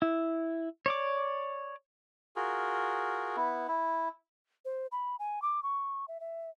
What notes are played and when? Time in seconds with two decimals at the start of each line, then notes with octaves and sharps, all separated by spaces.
0.02 E4
0.86 C#5 D5 D6
2.36 F4 F#4 G#4 A#4
3.36 B3 E4
3.68 E4
4.65 C5
4.92 B5
5.19 G#5
5.42 D6
5.63 C#6
6.08 E5
6.20 E5